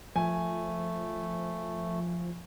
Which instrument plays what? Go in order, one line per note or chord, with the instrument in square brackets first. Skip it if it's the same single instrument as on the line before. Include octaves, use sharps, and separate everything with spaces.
[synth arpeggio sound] F3 [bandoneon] A3 [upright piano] G#5